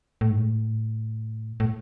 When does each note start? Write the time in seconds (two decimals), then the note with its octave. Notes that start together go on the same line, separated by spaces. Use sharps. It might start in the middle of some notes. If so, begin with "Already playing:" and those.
0.21 A2
0.30 G#2
0.38 A2
1.60 A2